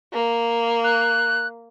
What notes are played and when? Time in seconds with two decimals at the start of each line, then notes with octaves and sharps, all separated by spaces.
0.13 A#3
0.84 F#6